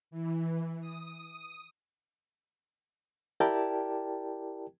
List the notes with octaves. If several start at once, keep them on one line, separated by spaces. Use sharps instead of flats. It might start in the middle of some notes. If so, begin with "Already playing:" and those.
E3
D#6
E4 G4 A#4 D5 G5 A5